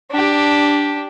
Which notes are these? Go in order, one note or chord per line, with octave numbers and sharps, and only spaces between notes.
D4 G4